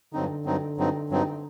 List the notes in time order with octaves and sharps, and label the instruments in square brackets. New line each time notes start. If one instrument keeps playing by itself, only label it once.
[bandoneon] G2 F#3 C4 D#4 [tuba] D3
[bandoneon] G2 F#3 C4 D#4
G2 F#3 C4 D#4
G2 F#3 C4 D#4